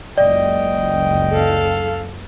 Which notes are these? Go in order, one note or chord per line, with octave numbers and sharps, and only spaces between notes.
F#1 C#2 D5 D#5 G5
A4 F5